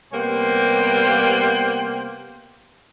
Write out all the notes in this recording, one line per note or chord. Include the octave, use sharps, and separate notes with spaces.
C3 G3 A#3 B3 C5 G5